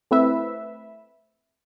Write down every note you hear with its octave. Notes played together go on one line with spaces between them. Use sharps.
A3 C4 E4 B4 E5